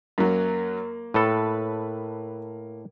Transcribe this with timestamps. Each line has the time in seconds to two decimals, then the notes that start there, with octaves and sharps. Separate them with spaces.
0.18 F#2 F#3 A#3
1.14 A2 A4 B4